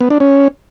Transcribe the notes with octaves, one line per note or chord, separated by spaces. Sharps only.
B3
D4
C#4